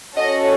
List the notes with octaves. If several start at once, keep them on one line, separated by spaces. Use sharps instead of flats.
C#4 F#4 A4 D#5